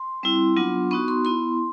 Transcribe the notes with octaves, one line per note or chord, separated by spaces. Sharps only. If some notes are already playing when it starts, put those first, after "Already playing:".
Already playing: C6
G3 C4 E4
F#3 B3 D4 F4
B3 D#4 F#4 C#6
C6
B3 E4 C6